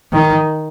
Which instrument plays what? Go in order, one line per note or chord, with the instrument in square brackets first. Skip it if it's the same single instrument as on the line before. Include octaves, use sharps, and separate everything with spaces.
[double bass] D#3